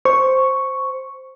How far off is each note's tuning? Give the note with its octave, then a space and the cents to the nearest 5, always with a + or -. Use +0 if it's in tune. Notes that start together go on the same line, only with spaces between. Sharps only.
C5 +0 C#6 +0